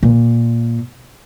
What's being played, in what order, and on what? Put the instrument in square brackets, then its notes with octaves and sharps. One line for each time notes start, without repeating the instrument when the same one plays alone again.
[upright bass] A#2